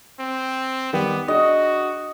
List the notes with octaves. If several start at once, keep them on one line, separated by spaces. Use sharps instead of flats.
C4
D#3 G3 B3 G4
D4 F#4 G#4 D#5